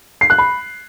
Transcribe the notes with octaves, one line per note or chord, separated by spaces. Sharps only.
C7
F#6
B5